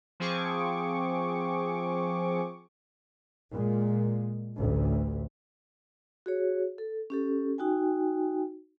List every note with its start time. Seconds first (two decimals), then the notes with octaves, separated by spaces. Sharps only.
0.20 F3 C4 G#4 C#6 D6
3.52 A#2 G#3
4.57 A1 D2
6.26 F#4 G#4 C#5
6.78 A4
7.10 C#4 G4 A4
7.58 D#4 F#4 G5 G#5